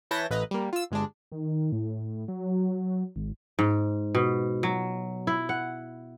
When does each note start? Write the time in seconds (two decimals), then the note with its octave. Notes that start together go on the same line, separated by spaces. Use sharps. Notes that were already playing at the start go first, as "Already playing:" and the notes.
0.11 E3 B4 C#5 A5 G6 A#6
0.30 A1 B4 D#5 A#5
0.51 G3 A#3
0.73 F4 E6
0.91 G1 G#3 D4
1.32 D#3
1.72 A2
2.28 F#3
3.16 G#1
3.59 G#2
4.15 B2
4.63 F#3
5.27 E4
5.49 F#5